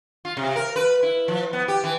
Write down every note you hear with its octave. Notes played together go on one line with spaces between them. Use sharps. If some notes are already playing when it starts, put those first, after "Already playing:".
F4
C3
A#4
B4
E4
F3
B3
G4
E3